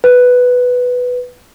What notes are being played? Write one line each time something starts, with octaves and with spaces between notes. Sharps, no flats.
B4